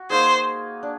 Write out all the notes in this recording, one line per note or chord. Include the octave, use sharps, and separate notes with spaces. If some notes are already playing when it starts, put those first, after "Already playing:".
Already playing: F#4
A#3 D#4 G#4 C5
D4